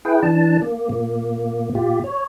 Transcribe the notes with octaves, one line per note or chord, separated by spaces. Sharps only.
E4 G#4 B4 G5
E3 D4 A5
A#3
A#2 A#3
A#2 F4 G4
C#5